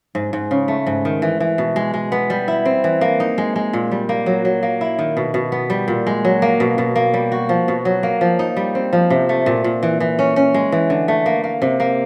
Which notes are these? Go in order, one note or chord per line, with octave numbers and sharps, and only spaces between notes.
G#2
G#2
C#3
A3
G#2
D#3
E3
E3
B2
G#3
G#3
B3
G3
E4
C4
E3
A#3
D#4
G#3
G#3
A#2
G3
A#3
F#3
F#3
A#3
E4
D#3
B2
B2
B3
G3
A#2
G#3
F#3
A#3
B2
B2
A#3
G3
F#4
F3
B2
F#3
A#3
F3
D#4
G3
C4
F3
C3
A3
A#2
A#2
E3
E3
C#4
C#4
G#3
E3
D3
A3
A#3
A#3
C3
A#3